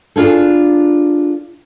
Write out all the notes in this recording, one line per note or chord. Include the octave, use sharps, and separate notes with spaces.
D4 F4 G#4 A4